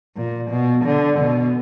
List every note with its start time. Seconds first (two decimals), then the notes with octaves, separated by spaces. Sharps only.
0.16 A#2
0.51 B2
0.85 D3
1.20 B2